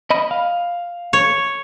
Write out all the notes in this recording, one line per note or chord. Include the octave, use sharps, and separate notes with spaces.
D#5 B5
F5
C#5